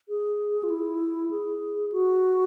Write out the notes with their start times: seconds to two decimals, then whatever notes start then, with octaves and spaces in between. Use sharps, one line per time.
0.09 G#4
0.63 F4
0.70 E4
1.31 G#4
1.92 F#4